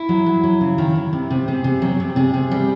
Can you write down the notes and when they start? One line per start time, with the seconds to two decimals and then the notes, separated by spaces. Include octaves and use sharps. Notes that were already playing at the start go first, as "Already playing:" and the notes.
Already playing: E4
0.09 F#3
0.26 F#3
0.44 F#3
0.61 C#3
0.78 D#3
0.95 F#3
1.13 C3
1.31 C3
1.48 C3 G#4
1.64 C3
1.82 F#3
2.00 C3
2.16 C3 G#4
2.34 C3
2.51 G3